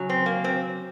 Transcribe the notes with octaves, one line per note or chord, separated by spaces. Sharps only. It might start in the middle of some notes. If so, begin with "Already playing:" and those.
Already playing: C#3 F#3
C4
A#3
C4